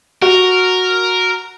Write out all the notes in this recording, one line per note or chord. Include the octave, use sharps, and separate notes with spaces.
F#4 A#4